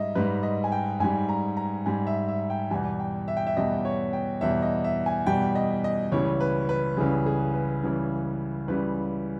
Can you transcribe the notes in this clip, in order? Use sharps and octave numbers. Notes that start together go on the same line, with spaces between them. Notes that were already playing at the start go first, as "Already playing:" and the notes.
Already playing: G#2 G3 D#5 E5
G#2 G3 B4
D#5
G#5
G5
G#2 G3 G#5
A#5
A#5
G#2 G3 G#5
E5
E5
G5
E2 B2 G3 G#5
G5
E5
G5
E5
E2 B2 G3 D#5
C#5
G5
E2 B2 G3 E5
D#5
E5
G#5
E2 B2 G3 G5
D#5
D#5
C#2 C#3 E3 G3 C#5
B4
B4
C#2 C#3 E3 G3 G#4
G#4
B4
C#2 C#3 E3 G3
C#2 C#3 E3 G3 B4